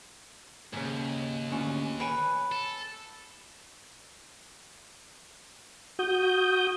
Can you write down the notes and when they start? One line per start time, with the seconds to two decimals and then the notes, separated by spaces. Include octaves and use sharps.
0.73 D#2 G#2 C#3
1.50 D2 C#4 F4
2.00 B4 C#5 G5 G#5
2.52 A4
5.99 F#4 D#6 G6